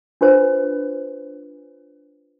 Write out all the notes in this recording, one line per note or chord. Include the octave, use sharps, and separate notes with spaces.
D4 F4 B4 C5